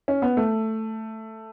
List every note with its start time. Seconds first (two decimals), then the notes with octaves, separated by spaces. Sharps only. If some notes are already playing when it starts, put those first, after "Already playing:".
0.08 C#4
0.22 B3
0.37 A3